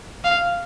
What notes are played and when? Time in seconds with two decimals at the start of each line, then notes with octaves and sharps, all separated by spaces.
0.24 F5